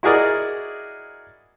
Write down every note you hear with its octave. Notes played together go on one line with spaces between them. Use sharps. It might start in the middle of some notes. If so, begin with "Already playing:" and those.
E4 F#4 G#4 A#4 D5 D#5